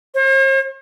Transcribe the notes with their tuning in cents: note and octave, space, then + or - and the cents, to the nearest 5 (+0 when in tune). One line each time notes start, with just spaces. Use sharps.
C5 +45